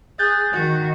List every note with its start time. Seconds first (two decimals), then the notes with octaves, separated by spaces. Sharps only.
0.19 G#4 F#6 G6 A6
0.53 D#3 F#4